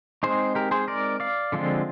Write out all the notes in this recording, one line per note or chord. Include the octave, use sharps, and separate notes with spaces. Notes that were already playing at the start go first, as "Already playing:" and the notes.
G#3 C4 D#4 G#4 C5
G4 A#4
G#4 C5
A#4 D5
D5 F5
D3 F3 G#3 C4 F4